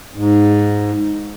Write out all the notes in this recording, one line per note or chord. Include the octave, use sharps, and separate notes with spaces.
G#2